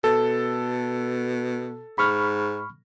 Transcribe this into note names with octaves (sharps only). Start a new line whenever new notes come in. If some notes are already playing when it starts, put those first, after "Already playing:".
B2 A4
G#2 B5 C#6 F6